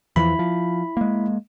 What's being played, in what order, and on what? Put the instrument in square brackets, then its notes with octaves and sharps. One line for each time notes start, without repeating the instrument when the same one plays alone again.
[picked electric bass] E2 E3 F3 [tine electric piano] E4 B5
[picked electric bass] F3
G#3 A#3